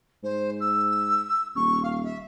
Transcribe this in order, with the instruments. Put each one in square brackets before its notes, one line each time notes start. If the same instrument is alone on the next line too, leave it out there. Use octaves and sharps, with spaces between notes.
[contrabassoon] G#2 [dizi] C5
[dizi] E6
[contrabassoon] D#1 [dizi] C#6
[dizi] F5
E5